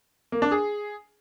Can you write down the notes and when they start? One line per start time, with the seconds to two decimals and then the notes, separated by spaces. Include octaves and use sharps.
0.32 A#3
0.42 D4
0.52 G#4